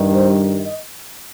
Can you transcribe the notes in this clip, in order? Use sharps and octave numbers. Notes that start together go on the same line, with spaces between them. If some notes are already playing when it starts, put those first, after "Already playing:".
Already playing: G2 D#3 G3
C5
D#5